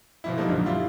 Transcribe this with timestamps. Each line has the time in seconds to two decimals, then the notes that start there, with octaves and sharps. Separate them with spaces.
0.24 B2 F3 E4
0.36 F3 G3 A#3 D#4 A4 C5
0.48 A#1 F#2 D3 F3
0.65 G3 E4 F4